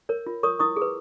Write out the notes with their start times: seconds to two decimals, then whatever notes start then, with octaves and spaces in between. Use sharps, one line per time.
0.09 A#4 C#5
0.27 F4
0.43 A#4 C#5 C#6 D#6
0.59 E4 C#6 D#6
0.76 G#4
0.82 B4